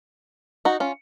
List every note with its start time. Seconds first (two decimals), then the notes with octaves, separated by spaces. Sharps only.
0.65 D#4 F#4
0.80 C#4 F4